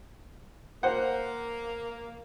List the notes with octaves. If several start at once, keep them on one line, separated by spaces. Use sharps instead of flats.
A#3 C5 F#5